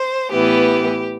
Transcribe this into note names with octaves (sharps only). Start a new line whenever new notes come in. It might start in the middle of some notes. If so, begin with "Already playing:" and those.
Already playing: C5
A2 E3 B3 G4